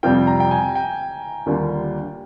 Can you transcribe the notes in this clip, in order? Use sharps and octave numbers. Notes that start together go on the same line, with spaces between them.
F2 C3 G3 C4 F4 G5
A#5
G5
G#5
G5
D#2 D3 G3 A#3 F4